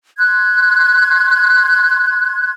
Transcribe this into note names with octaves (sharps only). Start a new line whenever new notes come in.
C6 F#6 G#6